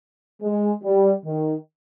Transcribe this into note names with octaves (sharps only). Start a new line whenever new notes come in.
G#3
G3
D#3